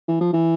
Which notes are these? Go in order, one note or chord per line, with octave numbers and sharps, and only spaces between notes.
E3
F3
E3